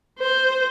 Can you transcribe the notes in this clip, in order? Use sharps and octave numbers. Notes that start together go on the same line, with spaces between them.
C5